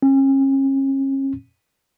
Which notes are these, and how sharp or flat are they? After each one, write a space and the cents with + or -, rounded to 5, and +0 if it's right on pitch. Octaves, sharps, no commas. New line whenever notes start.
C#4 -40